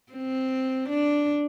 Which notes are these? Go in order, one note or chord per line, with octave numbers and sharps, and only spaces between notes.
C4
D4